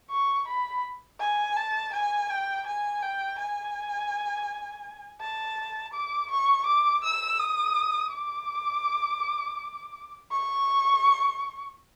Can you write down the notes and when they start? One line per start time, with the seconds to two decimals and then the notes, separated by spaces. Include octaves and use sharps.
0.11 C#6
0.48 B5
1.21 G#5
1.57 A5
1.94 G#5
2.30 G5
2.67 G#5
3.03 G5
3.39 G#5
5.21 A5
5.94 D6
6.31 C#6
6.67 D6
7.04 E6
7.40 D#6
8.13 D6
10.32 C#6